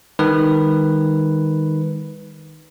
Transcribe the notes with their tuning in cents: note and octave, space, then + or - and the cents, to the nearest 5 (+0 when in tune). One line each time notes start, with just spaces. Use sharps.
D#3 +0 G#3 -45 B4 +0